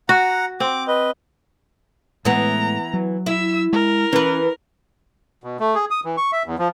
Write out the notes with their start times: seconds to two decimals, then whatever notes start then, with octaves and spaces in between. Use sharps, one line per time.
0.09 F#4 F#5 A#5
0.60 C4 D6
0.88 B4 D#5
2.25 A2 E3 G#3 A3 B3 A#5
2.93 F#3
3.26 E4 E5 E6
3.73 G#3 A#4
4.13 E3 C#4 B4
5.44 B2
5.60 A3
5.75 G#4
5.91 D#6
6.05 E3
6.17 C#6
6.32 E5
6.46 E2
6.59 F3